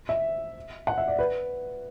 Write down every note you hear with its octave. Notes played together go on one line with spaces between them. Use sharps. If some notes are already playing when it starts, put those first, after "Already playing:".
E5
F#5
E5
D5
B4